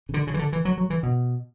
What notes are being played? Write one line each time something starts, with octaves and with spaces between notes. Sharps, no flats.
C#3
D3
C#3
E3
D3
E3
F#3
F#3
E3
B2